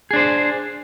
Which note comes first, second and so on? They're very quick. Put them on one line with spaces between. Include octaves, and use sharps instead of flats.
G#4 D4 C5